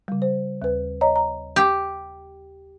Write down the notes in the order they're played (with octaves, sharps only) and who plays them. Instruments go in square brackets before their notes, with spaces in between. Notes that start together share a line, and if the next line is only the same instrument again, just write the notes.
[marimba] C#3 G3
C5
D#2 B4
C#5 D#5 A#5
A#5
[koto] G4